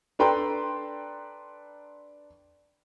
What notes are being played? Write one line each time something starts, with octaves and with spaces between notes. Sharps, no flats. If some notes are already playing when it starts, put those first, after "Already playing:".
D4 A4 B4 G5 A#5 C6